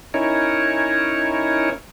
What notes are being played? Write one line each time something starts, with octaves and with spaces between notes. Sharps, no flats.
C#4 D#4 E4 A#4 C#5